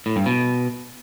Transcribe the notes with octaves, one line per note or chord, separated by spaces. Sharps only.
A2
G2
B2